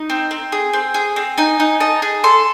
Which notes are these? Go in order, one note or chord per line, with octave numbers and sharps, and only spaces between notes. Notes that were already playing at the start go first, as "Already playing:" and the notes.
Already playing: D#4
C4
C4
G#4
C4
G#4
C4
D#4 G#5
D#4
D#4 A5
G#4
A4 C6